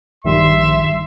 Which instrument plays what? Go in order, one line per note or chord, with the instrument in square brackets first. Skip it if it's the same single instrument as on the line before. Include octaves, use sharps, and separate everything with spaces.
[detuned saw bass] A#1 [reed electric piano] G2 D#3 G3 [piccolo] E5 [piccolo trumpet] C6